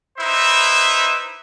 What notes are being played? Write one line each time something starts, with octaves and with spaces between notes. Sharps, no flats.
D#4 E4 B4 C5 E5